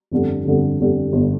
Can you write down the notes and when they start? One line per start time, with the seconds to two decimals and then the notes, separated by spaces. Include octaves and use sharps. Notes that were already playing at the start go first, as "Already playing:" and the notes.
0.11 G1 F2 D3 G3
0.45 G1 F2 D3 G3
0.80 G1 F2 D3 G3
1.13 G1 D3 G3